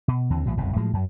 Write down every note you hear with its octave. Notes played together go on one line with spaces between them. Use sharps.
B2
D#2 D3 E3 C4
A#1 A2 E3 F#3
F#1 C2 F2 B2
A2 F3 F#3 G#3
F#2 F#3